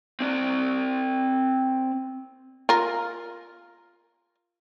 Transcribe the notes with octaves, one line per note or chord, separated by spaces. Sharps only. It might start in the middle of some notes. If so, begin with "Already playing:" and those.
C4 D5
F4 A#4